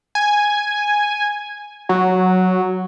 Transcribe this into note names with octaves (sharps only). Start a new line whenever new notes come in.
G#5
F#3